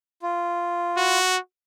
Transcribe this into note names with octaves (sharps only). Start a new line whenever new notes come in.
F4
F#4